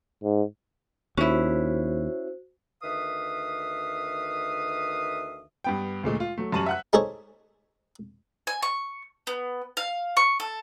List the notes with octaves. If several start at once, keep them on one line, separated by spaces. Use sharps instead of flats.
G#2
D#2 C#4 E4 F#4 C5
D2 D#3 B4 E5 F5 D#6
G2 B3 G5
D2 A#2 G#3 A3
F4
F#3 A3
F#2 G3 A5 C#6 D#7 F#7
E5 F#5 F#6
D#4 G#4 A4 C5 C#5
G#5
C#6
B3
F5
C#6
A4